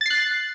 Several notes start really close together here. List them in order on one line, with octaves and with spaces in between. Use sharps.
A6 C7 F#6